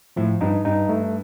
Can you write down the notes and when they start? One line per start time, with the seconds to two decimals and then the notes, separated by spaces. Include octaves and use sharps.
0.16 A2 F3
0.41 G2 D#4
0.65 G2 D#4
0.89 A3